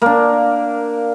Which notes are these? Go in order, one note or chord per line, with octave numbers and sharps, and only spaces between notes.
A#3 D4